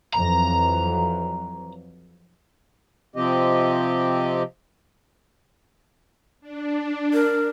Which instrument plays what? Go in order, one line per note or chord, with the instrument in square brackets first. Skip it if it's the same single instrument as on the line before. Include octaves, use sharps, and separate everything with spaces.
[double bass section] F2 E3 F#3 [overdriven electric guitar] A#5
[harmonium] C3 F3 C4 G4 D#5
[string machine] D4
[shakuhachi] A#4